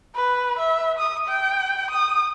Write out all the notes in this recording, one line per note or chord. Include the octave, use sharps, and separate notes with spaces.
B4
E5
D#6
G5
D#6